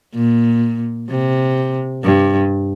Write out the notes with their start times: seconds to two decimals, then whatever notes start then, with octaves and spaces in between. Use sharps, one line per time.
0.15 A#2
1.09 C3
2.04 G2